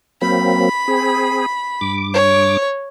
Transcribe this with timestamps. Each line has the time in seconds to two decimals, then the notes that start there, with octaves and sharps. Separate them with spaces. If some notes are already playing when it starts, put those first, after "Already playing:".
0.22 F#3 A#3 C4 B5
0.88 C4 G#4
1.81 G2 D6
2.13 C#5